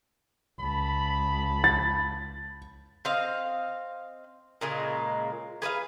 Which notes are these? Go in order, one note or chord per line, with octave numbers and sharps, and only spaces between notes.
C#2 A5 B5
A6
C4 D#5 F5
A#2 C#3 G#3 A#3
G#4 B4 E5 F5